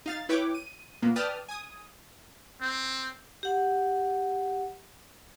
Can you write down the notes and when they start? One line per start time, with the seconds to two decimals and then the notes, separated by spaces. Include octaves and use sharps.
0.06 D#4 F5 A6
0.29 E4 B4 C#5 G5 D6
0.54 D#7
1.02 A#2 A#3 B3
1.16 B4 D5 G5 A5 D#6 F6
1.48 G#5 D#6
2.61 C4
3.43 G4 F#5